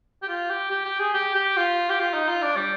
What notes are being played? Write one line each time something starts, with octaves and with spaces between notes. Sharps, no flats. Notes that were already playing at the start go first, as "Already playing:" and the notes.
G4
F4
G4
G4
G4
G#4
G4
G4
F4
G4
F4
D#4
F4
D4
G3